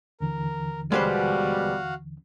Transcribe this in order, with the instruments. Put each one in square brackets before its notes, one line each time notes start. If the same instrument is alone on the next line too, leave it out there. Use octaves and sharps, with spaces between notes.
[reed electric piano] D#2 D3 E3 [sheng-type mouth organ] A#4
[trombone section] B2 G3 [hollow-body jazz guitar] G#3 B4 C5 [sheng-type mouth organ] F#4 F5 F#5